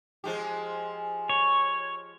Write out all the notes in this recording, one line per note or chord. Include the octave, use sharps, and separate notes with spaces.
F3 G#3 G4
C#5